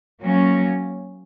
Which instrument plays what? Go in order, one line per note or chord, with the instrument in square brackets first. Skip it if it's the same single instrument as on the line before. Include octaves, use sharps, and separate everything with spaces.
[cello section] F#3 A#3 C#4